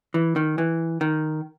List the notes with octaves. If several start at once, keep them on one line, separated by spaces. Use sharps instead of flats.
E3
D#3
E3
D#3